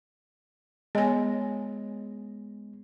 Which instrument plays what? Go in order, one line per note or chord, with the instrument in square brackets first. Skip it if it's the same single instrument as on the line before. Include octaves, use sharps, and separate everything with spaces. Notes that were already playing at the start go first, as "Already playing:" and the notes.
[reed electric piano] G#3 [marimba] B3 C#5 A#6 [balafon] D#5 G#5